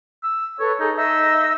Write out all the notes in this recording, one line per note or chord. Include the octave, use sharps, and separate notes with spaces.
E6
A4 B4 C#5
D#4 G#4 A4
D#4 D#5 E5 E6